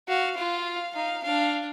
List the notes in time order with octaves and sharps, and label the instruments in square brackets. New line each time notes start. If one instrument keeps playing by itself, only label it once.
[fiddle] F#4 [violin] F5
[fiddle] F4 [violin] F5
[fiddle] D#4 [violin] F5
[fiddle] D4 [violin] F5